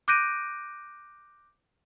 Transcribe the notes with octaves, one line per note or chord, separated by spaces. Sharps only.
D6 F#6 G6 A#6 D7 D#7